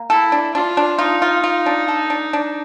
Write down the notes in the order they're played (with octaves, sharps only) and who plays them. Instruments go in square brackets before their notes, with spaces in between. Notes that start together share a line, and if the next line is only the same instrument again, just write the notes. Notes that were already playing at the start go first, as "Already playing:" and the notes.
Already playing: [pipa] A#3
[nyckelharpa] E4 [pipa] A4
[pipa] D4
[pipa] D4 [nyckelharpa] F4
[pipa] D4
[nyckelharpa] D#4 [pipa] F4
[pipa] F4
F4
D4
A4
D4
D4